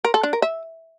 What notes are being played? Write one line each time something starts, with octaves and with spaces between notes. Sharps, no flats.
A#4
A4
D4
A#4
E5